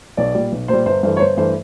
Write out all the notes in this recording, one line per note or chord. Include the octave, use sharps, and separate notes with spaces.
B1 D5
A#2 G3
B1
A#2 G3 C5
G1 C5
G2 E3 A3 C5
C#5
G1 C5
G2 E3 A3 C5